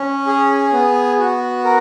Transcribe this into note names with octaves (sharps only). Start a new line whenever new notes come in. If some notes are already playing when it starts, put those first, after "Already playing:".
Already playing: C#4
G#4
B3
F#4
A#4